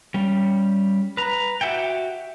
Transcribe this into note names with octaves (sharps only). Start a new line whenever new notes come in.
G3 C#4
B4 A#5
F#4 G4 E5 F#5 G5